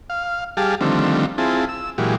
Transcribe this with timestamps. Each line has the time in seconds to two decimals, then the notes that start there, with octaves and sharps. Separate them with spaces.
0.10 F5
0.57 G3 G4 G#4 F5 A5
0.81 D3 D#3 F3 G3 A3 C4
1.38 C4 E4 F4 G#4 A5
1.69 E6
1.98 A#2 E3 F#3 G#3 G4